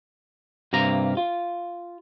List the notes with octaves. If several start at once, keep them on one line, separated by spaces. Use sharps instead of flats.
G2 C3 A#3 A#5
F4